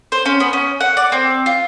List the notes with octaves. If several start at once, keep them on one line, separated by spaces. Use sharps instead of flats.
C5
C#4
B3
C#4
F#5
D5
C4
F4